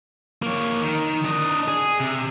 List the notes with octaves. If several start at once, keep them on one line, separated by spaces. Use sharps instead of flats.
A#3 C#5
D#3
D4 D#5
G#4
C3